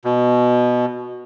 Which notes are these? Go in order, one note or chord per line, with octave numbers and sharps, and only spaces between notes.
B2